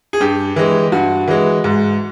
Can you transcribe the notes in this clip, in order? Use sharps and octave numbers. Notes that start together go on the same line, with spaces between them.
G#4
G2 G4
E3 G#3
G2 F#4
E3 G#3
G#2